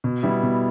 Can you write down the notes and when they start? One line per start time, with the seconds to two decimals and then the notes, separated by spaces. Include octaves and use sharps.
0.04 B2
0.23 G3 B3 E4
0.43 B2